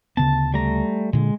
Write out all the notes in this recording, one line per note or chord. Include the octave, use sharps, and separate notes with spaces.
D2 C#3 B3 A5
G3 A3 A#5
A#2 D3 G#3